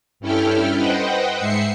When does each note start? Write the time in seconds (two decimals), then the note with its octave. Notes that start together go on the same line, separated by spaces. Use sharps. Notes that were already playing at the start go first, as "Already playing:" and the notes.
0.20 G2 C#4 E4 A4 G5 F6
0.76 B4 C5 D#5 F#5 G5
1.38 G#2 E5 C7 C#7